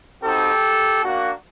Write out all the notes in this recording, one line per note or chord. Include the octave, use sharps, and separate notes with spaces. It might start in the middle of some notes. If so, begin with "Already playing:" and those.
C4 D#4 F#4 G4 A4
A#3 D4 F#4